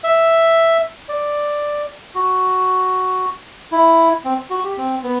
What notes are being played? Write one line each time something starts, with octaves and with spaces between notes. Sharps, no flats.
E5
D5
F#4
E4
C4
F#4
G4
C4
B3